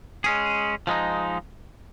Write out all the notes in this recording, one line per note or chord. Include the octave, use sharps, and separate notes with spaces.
G#3 C#4 G#4
F3 G#3 D#4